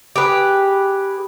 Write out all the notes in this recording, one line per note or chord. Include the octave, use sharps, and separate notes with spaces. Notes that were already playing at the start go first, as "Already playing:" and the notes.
G4 G#4 B4